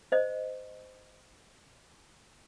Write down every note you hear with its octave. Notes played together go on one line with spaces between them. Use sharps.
C5 D#5